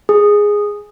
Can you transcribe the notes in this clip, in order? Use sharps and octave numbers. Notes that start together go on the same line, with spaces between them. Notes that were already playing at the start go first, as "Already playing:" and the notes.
G#4